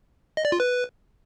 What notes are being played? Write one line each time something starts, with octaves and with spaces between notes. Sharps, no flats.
D#5
D5
F4
B4